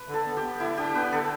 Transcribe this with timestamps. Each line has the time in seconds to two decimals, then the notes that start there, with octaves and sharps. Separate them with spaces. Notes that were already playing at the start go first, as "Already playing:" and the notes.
Already playing: B4
0.08 D3
0.14 A4
0.26 B3
0.37 G4
0.42 B3
0.60 D3 E4
0.77 D4 G4
0.95 B3 B4
1.12 D3 A4